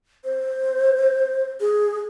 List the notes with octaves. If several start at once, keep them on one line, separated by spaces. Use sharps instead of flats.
C5
G#4